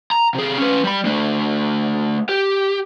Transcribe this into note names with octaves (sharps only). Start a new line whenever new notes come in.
A#5
C3 G#4
C#4 B4
G3 B5
A3 D4
G4